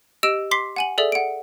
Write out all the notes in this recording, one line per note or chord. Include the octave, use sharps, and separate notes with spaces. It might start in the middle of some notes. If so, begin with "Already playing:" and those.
G4 D#5 E6 D7 E7
C6 D6 B6 C7 G7
F#5 G#5 F#7
G#4 A4 D5 E5
F#5 D7